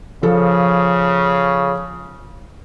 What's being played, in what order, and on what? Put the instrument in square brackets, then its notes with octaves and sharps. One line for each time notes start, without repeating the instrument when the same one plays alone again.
[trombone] C#3 [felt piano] F3 A4 F5